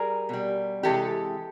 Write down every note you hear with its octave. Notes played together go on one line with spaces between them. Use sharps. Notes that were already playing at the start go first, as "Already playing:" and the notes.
Already playing: G3 G#4 A#4
B2 G3
C3 E3 G#3 G4 A4